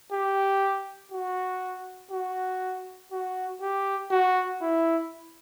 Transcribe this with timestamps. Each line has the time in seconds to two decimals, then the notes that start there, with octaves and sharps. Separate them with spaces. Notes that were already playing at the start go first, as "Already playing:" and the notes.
0.12 G4
1.12 F#4
2.11 F#4
3.12 F#4
3.62 G4
4.11 F#4
4.62 E4